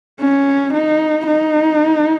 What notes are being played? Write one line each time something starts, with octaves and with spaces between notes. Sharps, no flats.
C#4
D#4
D#4